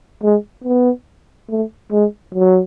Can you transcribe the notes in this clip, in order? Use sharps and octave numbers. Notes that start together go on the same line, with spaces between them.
G#3
B3
A3
G#3
F#3